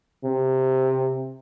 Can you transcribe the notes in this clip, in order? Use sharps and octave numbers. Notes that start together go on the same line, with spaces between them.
C3